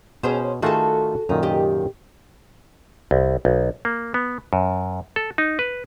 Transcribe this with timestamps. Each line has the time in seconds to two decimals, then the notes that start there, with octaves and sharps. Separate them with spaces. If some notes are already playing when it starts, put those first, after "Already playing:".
0.23 B2 C#4 G#4 C5
0.62 D#3 A3 F4 F#4 G#4 A4
1.29 F#2 A#2 D#3 D#4
1.42 C3 G4 D#5
3.11 C2
3.45 B1
3.85 A#3
4.14 B3
4.53 F#2
5.16 A4
5.38 D#4
5.59 B4